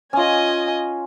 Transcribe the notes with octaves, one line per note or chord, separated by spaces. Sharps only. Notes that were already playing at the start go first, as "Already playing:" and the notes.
C#4 F4 D#5 G#5